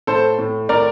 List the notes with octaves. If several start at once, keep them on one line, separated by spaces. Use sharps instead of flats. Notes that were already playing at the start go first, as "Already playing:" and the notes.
A2 A4 C5
A2
A2 A#4 D5